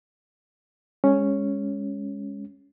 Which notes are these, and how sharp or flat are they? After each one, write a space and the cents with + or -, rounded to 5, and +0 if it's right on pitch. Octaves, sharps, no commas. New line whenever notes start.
G#3 -20 C#4 +0